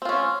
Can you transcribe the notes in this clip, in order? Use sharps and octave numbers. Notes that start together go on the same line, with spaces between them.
C4 C#4 F4